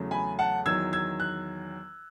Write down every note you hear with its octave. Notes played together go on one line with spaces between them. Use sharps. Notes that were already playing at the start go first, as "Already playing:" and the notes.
Already playing: E2 C#3 F#3 A3
G#5 B5
F#5 A5
E2 D#3 F#3 E6 G#6
E6 G#6
F#6